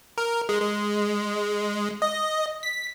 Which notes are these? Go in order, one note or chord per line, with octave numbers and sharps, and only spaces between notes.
A#4
G#3
G#3
D#5
B6